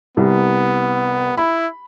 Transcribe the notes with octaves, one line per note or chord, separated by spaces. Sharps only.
C2 B3
E4 B5